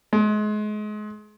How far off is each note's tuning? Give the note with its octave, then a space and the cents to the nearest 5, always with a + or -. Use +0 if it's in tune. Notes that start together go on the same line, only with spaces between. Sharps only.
G#3 +30